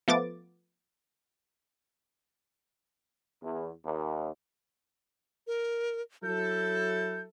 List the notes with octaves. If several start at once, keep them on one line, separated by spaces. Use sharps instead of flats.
F3 A3 B3 F4 D6 A6
E2
D#2
A#4
F#3 E4 A4 G6